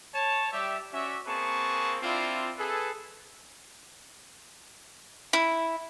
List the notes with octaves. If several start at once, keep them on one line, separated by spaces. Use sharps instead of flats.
C#5 A5
G3 G4 E5
C#4 F#4 D5 E5
A#3 C4 G#4 B4 A5 C#6
C4 D4 E4 F4
G#4 A4 B4
E4